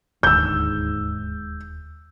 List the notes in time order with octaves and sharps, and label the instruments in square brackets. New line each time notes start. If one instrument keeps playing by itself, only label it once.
[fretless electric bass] D#1 D2 [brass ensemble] G#2 [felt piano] E6 G6